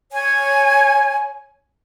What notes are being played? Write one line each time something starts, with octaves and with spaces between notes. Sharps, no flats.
C#5 G#5